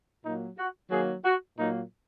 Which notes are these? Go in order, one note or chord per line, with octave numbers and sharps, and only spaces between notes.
A#2 F#3 A#3 D#4
F#4
D#3 F#3 A#3 G#4
F#4
A#2 F#3 A#3 D#4